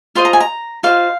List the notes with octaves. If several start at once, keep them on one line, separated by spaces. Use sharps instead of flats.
F4 C5 D#5 C6
A#5
G#5
A#5
F4 C5 D#5 F5